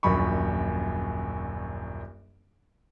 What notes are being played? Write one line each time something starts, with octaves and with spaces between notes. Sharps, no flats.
D#1 A#1 F#2 B5 C#6